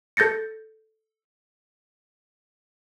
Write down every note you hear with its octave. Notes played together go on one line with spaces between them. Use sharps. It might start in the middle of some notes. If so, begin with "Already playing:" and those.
A4 G6 A6 A#6 C#7